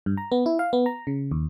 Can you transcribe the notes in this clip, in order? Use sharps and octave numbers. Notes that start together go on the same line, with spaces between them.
G2
A#5
B3
E4
F5
B3
A#5
C#3
D#2